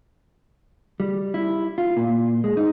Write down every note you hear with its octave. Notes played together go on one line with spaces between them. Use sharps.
G3
E4
F4
A#2
G#3
D#4